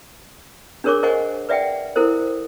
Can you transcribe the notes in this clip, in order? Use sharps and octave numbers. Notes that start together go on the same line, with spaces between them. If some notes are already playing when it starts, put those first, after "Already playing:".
D4 G#4 A#4 C#5 C#6 D6
A#4 C5 D#5 F#5 G#5 C#6
B4 D5 E5 F#5 G5
E4 A4 A#4 C5